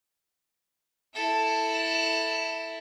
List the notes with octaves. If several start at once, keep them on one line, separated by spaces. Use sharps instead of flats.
E4 A4